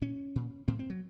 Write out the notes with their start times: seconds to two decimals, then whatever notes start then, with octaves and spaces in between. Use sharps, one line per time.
0.02 A#2 C#4
0.36 A#2
0.68 A2 C4
0.79 C4
0.90 F#3